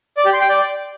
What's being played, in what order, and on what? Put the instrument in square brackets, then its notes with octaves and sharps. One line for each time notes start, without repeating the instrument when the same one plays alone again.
[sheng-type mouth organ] D5
G4
C6
G5
D5